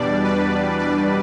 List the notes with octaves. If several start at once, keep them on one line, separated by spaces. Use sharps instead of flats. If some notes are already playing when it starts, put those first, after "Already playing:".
Already playing: E2 B2 G3 D4 D5
B4
D5